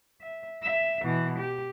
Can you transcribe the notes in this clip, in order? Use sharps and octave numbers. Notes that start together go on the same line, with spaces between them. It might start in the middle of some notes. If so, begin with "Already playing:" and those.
E5
E5
B2 E3
G4